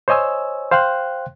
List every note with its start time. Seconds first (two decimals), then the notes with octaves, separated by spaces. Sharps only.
0.08 C5 C#5 D#5 G#5 E6
0.71 C5 F5 G5 C6 F#6